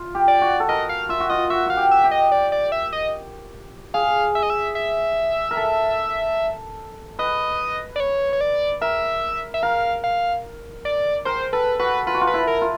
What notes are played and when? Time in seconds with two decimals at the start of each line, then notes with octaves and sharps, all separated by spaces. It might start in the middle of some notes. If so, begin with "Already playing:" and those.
Already playing: F4
0.15 G4
0.28 D5
0.42 F#4
0.60 A4
0.69 A#4 D#5
0.89 F5
1.09 F4 E5
1.20 F#4
1.30 F4 D#5
1.50 F#4 E5
1.66 F#4 F5
1.77 G4
1.91 E5
2.04 G4
2.11 D#5
2.32 D5
2.52 D5
2.72 E5
2.93 D#5
3.94 G#4 F5
4.35 E5
4.43 D#5
4.50 E5
4.75 E5
5.51 A#4
5.57 A4
7.19 B4 D#5
7.96 D5
8.00 C#5
8.33 C#5
8.41 D5
8.81 A#4 E5
9.54 E5
9.63 A#4 F5
10.04 F5
10.85 D5
11.25 A#4 C5
11.53 A4 B4
11.79 F#4 B4
12.07 F4 B4
12.14 F#4
12.21 F4
12.27 B4
12.34 E4
12.47 A#4
12.61 F4